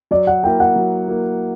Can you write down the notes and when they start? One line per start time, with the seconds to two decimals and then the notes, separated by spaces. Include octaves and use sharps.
0.11 F#3 D5
0.27 F#5
0.43 A#3 E4 A#4 G5
0.60 F#5
0.76 F#3
1.08 A#3 E4 A#4